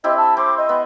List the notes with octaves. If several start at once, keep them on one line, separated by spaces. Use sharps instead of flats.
C4 E4 G4 D#5
A5
C4 D6
D#5
B3